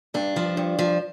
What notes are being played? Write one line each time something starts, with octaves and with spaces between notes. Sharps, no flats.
G2 D4
F3
G2
F3